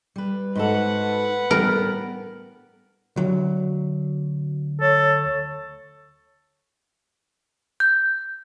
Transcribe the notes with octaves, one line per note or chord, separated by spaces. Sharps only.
G3 B4
G#2 F#4 A4 B4 F#5
A2 G3 B3 A#4
D2 F#3
A4 C#5
G6